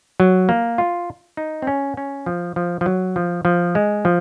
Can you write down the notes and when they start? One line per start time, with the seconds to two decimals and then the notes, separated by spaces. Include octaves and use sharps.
0.20 F#3
0.49 A#3
0.78 F4
1.37 D#4
1.62 C4
1.67 C#4
1.97 C#4
2.26 F3
2.56 F3
2.81 F3
2.86 F#3
3.16 F3
3.45 F3
3.75 G#3
4.05 F3